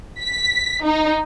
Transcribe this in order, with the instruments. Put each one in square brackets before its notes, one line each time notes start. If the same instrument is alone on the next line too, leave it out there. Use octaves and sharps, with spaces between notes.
[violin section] B6
D#4